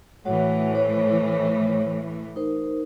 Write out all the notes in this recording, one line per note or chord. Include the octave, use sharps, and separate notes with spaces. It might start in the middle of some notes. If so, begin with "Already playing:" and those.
A2 E3 F#4 C#5 F#5
C5 C#5
D#4 A#4 C5